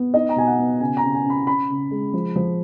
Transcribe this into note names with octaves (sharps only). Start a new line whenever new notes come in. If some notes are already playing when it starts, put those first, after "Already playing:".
Already playing: B3
D#4 D#5
A#5
B2 G#5
F#5
B3
C#3 G#5
A#5
C#3
G#5
C#4
B5
C#4 B5
C#3
G#3
F3
F3